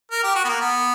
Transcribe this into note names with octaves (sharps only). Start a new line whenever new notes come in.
A#4
G4
F#4
B3
A#3
B3